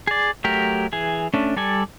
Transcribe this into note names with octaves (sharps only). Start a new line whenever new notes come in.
G#4 D5
F#3 A3 G4 A#4
E3 G#4
A3 C#4 D4
G3 A4 D5 G#5